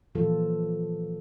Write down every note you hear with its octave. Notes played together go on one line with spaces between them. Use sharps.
A#2 E3 F3 F4 A4